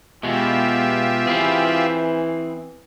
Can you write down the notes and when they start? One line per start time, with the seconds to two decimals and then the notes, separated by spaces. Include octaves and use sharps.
0.23 B2 G#3 B3 F4 G4 E5
1.27 E3 C4 E4 G#4